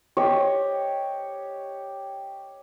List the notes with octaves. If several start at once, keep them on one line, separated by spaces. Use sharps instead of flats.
G4 C#5 D#5